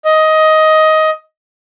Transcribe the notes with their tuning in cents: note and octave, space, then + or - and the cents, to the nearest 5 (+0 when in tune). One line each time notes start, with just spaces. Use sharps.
D#5 +15